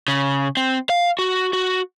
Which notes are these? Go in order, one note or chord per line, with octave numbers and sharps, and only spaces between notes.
C#3
C4
F5
F#4
F#4